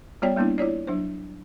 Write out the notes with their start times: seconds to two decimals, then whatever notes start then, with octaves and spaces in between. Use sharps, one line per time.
0.22 G3 B3 F4 C#5 D5 G5
0.36 G3 A#3 B3 D4 E4
0.58 E4 F4 C#5 D5
0.87 F#3 D4 C5